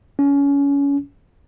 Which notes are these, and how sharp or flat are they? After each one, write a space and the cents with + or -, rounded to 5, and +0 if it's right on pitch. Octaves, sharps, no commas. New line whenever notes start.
C#4 +25